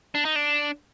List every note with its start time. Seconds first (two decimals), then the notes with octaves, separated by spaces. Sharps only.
0.15 D4
0.25 D#4
0.36 D4